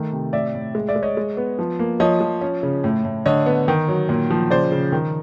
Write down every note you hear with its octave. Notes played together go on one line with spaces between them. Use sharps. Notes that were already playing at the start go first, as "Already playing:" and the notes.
Already playing: D#3 A3
C3
A2 D5 E5
A2
G#3
D5 E5
G#3
C#5 D#5
G#3
B3
F3
A#3
F3 C#5 D#5
F3
C#4
C#3
A2
A2
D3 C#5 D#5
B3
D#3
F#3
A#2
F3
C#3 C5 D5
C#3
D#3